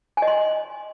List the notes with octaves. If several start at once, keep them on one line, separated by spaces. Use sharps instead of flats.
G#5
D#5
C6